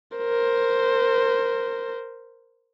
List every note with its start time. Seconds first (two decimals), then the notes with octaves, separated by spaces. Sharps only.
0.17 A#4 C5